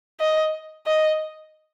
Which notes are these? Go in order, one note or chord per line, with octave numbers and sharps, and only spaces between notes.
D#5
D#5